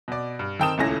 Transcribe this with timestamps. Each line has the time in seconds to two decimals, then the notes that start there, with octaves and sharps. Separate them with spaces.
0.08 B2 D5
0.39 G2
0.59 D#3 C4 G5 A5 D#6 E7
0.78 D#1 C#2 A3 C#4 E4 A#6